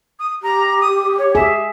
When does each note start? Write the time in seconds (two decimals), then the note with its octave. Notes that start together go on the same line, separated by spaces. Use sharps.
0.19 D#6
0.43 G4 A#5
0.80 D#6
1.18 C#5
1.35 G#4 E5